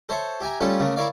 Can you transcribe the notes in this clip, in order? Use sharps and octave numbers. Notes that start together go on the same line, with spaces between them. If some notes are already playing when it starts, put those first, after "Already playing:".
A4 C5 C#5 E5
G4 E5 G#5 A#5
G3 A3 C#4 F4 A4 C#5
C#3 A3 A#3
E4 A#4 C#5 D5 F5